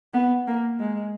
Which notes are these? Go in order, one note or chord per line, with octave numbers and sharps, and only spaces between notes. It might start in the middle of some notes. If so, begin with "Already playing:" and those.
B3
A#3
G#3